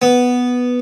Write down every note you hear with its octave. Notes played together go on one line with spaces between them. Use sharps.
B3